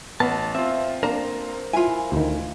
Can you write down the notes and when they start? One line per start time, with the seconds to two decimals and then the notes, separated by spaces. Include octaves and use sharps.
0.20 A1 B3 A5
0.55 C4 F4 E5
1.03 A#3 D4 A#4 C5 A#5
1.73 E4 F4 G#5
2.12 D2 D#3